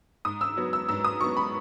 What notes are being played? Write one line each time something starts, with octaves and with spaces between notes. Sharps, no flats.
G#2 D#6
E6
F#3 B3
E6
G#2 E6
D#6
F#3 B3 C#6
B5